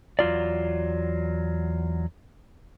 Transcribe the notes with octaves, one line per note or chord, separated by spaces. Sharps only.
E2 F#3 F4 D5